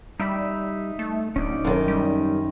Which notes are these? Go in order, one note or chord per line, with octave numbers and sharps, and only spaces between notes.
G3 D#4 E5 B5
A3
D1 C#4 D#4 D5
F#2 D#3
G3